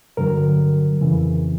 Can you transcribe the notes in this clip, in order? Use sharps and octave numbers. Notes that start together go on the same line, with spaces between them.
G2 D3 F#3 A#4
F2 C#3 E3